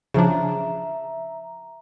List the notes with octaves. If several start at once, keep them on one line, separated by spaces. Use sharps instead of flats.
C#3 F3 D4 E5 A#5